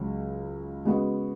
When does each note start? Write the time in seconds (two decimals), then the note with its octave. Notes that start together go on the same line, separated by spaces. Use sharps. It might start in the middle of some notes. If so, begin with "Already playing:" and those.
Already playing: C#2 C#3 F#3 C#4
0.85 C#3 G#3 B3 F#4